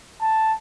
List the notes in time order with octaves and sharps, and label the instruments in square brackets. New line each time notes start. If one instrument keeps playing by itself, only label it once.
[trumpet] A5